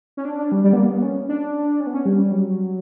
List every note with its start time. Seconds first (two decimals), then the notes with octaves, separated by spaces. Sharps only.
0.17 C#4
0.25 D4
0.38 D4
0.52 G3
0.64 G3
0.73 B3
0.77 A#3
0.89 B3
1.02 C#4
1.29 D4
1.80 C#4
1.87 B3
1.94 C#4
2.06 G3
2.32 F#3